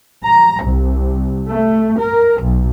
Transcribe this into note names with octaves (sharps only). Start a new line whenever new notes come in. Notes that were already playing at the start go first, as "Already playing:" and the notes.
A#5
C2
A3
A#4
B1